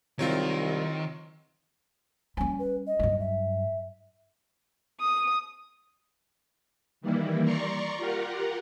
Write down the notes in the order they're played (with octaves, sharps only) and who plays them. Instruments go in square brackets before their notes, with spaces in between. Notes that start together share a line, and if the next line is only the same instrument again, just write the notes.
[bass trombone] C2 [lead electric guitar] D#3 [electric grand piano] F#3 C4 F4
[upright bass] G3 C#4 [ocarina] G#5
[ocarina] B4
D#5
[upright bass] G2 F#3
[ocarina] E5
[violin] D#6
[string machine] D#3 E3 G3 A#3 E4
D5 A#5 C6 C#6
F4 G4 A#4 F#5